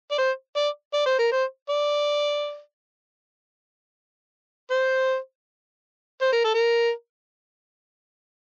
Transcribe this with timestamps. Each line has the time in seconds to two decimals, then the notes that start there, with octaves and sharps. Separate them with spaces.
0.11 D5
0.18 C5
0.56 D5
0.93 D5
1.06 C5
1.19 A#4
1.32 C5
1.69 D5
4.71 C5
6.22 C5
6.32 A#4
6.44 A4
6.54 A#4